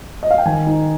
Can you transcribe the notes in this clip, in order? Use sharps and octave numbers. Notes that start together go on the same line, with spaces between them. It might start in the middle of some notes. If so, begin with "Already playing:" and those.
D#5
F5
G5
D#3 G#5
D#4